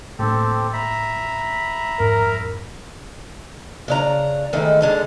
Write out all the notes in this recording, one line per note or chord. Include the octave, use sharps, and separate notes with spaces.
A2 A#3 C4 D4 G4 A4
E5 A#5 B5
F2 G#2 A#4
C#3 D4 A#5
D#3 E3 G#3 A3
D3 G#3 A4